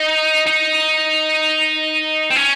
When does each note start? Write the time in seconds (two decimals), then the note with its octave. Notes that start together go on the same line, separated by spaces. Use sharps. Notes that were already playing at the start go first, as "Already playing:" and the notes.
Already playing: D#4
0.47 D#4
2.30 C4
2.36 C#4